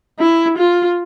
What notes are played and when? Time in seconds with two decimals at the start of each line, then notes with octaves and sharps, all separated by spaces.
0.19 E4
0.58 F4